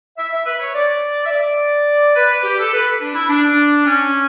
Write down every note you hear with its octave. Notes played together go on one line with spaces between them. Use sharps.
E5
E5
B4
C#5
D5
E5
D5
B4
G4
A4
B4
D4
E4
D4
C#4